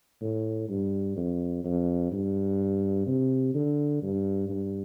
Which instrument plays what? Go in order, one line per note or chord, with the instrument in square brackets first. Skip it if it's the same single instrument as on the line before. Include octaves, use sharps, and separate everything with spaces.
[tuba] A2
G2
F2
F2
G2
C3
D3
G2
G2